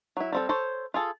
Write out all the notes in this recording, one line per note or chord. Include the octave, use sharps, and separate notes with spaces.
F#3 E4
G3 C4 A4
A4 C5 C#5
F4 G#4 A4